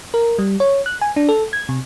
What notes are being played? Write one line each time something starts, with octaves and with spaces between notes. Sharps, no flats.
A#4
G3
C#5
F#6
G#5
D4
A4
G#6
C3